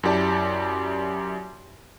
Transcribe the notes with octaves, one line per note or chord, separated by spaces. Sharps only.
F#2 E4 G4 D5 A5